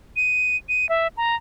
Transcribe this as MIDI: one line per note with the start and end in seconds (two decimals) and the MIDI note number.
0.16 0.57 99
0.69 0.89 99
0.89 1.08 76
1.17 1.36 82